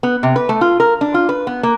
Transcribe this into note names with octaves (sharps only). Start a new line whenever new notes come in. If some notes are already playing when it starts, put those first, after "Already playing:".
B3
C3
B4
A3
F4
A#4
D4
F4
B4
B3
A#3